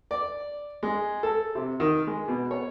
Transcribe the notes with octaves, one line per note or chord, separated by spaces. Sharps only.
D5
G#3
A4
C3
D#3
G#3
B2
C#5